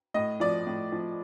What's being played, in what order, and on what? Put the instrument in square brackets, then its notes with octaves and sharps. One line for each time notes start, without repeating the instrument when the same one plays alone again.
[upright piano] A2 D#5
F3 D5
A2
F3